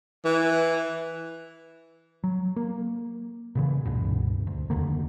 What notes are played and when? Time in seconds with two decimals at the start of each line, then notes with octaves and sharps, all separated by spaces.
0.25 E3
2.24 F#3
2.56 A#3
3.55 A#2 C#3 E3
3.85 C#2 G2 B2
4.47 D2
4.70 F1 D#2 D3 A#3